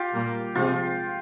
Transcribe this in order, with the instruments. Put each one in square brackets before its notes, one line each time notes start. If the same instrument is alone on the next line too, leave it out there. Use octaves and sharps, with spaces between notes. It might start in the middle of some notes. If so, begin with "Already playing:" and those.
Already playing: [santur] F4 G4
[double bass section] A#2 G3 A#3
[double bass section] C3 F3 G#3 C4 [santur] F4